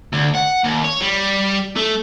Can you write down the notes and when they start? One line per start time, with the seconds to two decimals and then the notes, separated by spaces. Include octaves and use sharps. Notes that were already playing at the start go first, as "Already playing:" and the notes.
0.13 D2
0.35 F#5
0.64 D#2
0.85 C#5
1.02 G3
1.76 A3